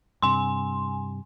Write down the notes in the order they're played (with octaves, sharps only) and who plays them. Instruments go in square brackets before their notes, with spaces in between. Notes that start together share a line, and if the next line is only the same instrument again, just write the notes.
[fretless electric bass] G2 C3 [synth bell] G#5 C6